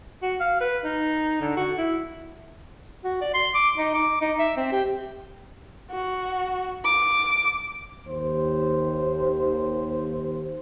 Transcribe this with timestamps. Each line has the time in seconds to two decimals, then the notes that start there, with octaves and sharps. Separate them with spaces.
0.22 F#4
0.40 F5
0.61 B4
0.84 D#4
1.41 D3
1.57 F#4
1.78 E4
3.04 F#4
3.21 D5
3.34 C6
3.55 D6
3.78 D#4
3.94 D6
4.21 D#4
4.39 E5
4.57 C4
4.72 G4
5.91 F#4
6.85 D6
8.07 D#2 C5